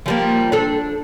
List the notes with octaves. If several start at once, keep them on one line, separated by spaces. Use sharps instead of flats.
F3 G3 A#3
D4 A4